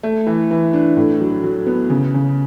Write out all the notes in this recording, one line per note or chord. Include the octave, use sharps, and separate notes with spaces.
A3
E3
E3
D4
A2
F#3
F#3
B3
C#3
C#3